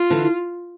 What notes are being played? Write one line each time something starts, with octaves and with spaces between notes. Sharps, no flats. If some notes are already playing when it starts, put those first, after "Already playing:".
Already playing: F4
D3 E3